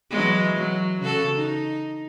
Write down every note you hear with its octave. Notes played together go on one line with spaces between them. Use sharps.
E3 F#3 G#3
F#3
C#3 F#4 A4
D#4